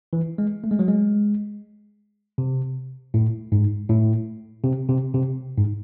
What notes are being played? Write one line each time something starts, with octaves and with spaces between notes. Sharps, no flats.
E3
G#3
A3
G#3
F#3
G#3
C3
A2
G#2
A2
C3
C3
C3
G#2